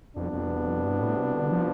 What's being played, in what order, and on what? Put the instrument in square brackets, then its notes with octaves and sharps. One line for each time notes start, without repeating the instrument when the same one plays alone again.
[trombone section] C2 B2 B3 D4 [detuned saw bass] F2
[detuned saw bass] F2
E2
F2
G2
A2
C3
D3
F3